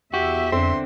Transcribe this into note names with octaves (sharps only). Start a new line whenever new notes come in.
E2 F#4 G4 E5
F2 D3 C4 C6